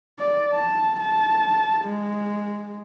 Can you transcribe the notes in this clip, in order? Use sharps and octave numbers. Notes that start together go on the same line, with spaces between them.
D5
A5
A5
G#3